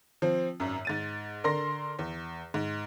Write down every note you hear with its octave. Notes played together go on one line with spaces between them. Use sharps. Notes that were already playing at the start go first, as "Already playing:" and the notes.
F3 C4
G#1 F#2
G#2 A6 D#7
D3 A#4 C6 A#6
E2
G#2